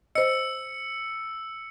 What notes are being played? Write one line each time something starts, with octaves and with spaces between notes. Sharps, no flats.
C5 D#5 E6 C#7